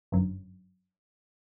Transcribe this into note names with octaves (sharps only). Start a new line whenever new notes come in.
G1 F#2